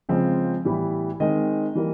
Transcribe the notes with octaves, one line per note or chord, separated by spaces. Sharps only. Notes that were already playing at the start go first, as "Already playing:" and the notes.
C#3 F3 G#3 C4
A2 E3 G3 B3 E4
D#3 G#3 C4 D#4 D#5
E3 G3 A#3